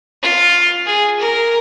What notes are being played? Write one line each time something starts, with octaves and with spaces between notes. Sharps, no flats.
F4
G#4
A#4